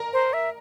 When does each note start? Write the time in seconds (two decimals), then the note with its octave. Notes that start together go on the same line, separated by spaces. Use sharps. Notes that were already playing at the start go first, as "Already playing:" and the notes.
Already playing: A#4 A#5
0.13 C5
0.33 E5